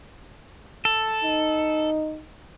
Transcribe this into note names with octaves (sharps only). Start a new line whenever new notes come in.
A4
D#4